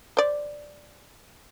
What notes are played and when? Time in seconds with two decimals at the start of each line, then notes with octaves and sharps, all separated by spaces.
0.17 C5 D5